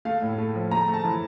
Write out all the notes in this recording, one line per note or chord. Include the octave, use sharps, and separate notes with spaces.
A3 F5
A2
A3
F3
A3 A#5
A3
A5
E3